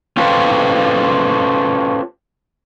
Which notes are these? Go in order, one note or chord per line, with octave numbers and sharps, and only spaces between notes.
C#4 F4 G4 A4 B4 C5